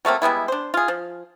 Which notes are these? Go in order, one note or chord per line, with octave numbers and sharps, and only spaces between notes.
F#3 A3 A#3 C4
G3 G#3 B3 E4
D4 C5
F4 G#4
F3